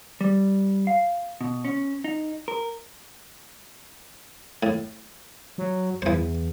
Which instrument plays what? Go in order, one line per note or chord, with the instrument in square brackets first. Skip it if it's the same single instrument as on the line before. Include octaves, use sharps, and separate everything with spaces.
[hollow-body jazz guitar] G3
F5
B2
C#4
D#4
A#4
[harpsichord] A2
[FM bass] F#3
[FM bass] E2 [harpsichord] E3 C5